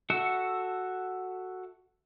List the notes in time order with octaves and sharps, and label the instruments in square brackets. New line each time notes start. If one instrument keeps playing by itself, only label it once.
[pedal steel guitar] F#4 A4 E5 F#5